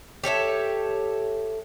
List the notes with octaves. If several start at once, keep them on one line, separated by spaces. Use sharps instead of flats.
G4 A4 C#5 E5